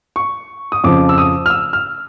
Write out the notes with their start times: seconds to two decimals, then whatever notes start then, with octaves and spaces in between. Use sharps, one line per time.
0.16 C#6
0.72 D#6
0.84 F2 C#3 F3 D6
1.09 E6
1.18 D#6
1.46 F6
1.50 E6
1.73 F6